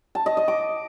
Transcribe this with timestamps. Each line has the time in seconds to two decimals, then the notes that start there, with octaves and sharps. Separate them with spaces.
0.15 A5
0.26 D#5
0.37 D#5
0.48 D6